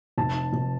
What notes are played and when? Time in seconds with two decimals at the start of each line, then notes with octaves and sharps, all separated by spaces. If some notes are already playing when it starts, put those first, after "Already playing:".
0.18 F1 A5
0.53 F1